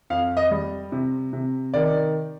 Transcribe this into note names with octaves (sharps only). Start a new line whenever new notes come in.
F2 F5
D#5
G3
C3
C3
D#3 D5